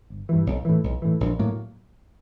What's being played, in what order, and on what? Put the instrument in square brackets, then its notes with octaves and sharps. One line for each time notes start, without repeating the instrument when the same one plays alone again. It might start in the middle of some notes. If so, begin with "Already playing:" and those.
[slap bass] G1
G2 E3
B1
A2 E3
B1
A2 E3
A#1
A2 F#3 A#3